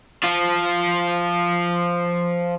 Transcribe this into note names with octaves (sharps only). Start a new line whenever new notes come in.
F3 F4